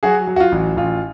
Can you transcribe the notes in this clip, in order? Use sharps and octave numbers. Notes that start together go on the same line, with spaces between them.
F#3 F#4 G#4
F#3
F#4
F4
A1
A1 F4